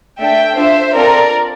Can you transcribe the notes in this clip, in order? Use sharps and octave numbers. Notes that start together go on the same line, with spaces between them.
A3 D4 A4 E5 G5
D4 F4 A4 C5 E5
C4 F4 A4 A#4 D5